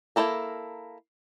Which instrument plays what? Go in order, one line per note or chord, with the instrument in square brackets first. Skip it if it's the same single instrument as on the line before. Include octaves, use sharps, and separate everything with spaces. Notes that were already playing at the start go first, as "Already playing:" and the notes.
[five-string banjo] A#3 D4 E4 A4 A#4